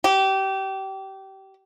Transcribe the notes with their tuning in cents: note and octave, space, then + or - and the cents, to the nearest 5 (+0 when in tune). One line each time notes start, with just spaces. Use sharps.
G4 -25